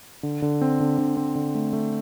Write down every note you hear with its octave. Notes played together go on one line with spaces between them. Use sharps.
D3
D3
C4
D3
D3
C4
D3
A3
A3